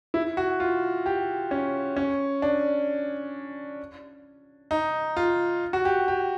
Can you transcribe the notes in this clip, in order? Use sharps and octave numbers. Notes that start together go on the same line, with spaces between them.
E4
F#4
F4
G4
C#4
C#4
D4
D#4
F4
F#4
G4
G4